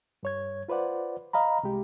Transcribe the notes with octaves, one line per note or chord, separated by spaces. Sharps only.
G2 C#5 G#6
F4 B4 C5 D5 F#5
D#5 F5 A#5 B5
C2 G#3 G4